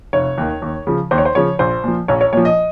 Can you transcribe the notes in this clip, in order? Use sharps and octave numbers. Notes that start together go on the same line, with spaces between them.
F1 C#5
D#2 D#3
D#2
C#3 F3
D#2 C5
C#5
C5
C#3 F3 C#5
A#1 C5
A#2 F3
A#1 C#5
C#5
A#2 F3 C#5
D#5